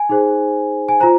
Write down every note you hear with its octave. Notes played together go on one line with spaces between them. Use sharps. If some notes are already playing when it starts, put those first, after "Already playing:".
Already playing: G#5
D#4 G#4 C5
G#5
F4 C5 A#5